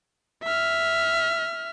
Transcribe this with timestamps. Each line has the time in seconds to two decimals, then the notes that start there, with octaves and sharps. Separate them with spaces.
0.44 E5 F6